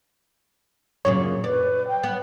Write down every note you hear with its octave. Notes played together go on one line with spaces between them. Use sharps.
F#2 A#2 C#3 C#5
B4 D5
G5
B3